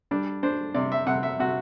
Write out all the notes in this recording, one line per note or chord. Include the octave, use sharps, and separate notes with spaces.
G3 D4
D4 C5
C3 D5
E5
C3 F#5
E5
C3 F#4